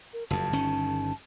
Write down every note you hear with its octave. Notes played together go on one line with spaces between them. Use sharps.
A#4
F#1 F2 A5
G1 D#3 C#4